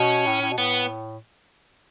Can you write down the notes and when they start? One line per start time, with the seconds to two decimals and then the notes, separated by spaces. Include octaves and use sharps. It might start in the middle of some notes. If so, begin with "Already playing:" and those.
Already playing: B2 C#4
0.26 A2
0.42 A2
0.51 B2
0.58 A2 B3